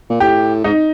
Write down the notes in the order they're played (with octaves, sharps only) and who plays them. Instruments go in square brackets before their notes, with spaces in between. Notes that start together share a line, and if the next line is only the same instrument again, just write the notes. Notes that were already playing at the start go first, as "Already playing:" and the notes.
[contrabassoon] A#2
[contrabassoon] A2 [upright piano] G4
[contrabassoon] G#2 [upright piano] D#4